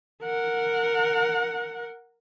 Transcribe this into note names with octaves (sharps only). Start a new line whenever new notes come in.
A#4 F#5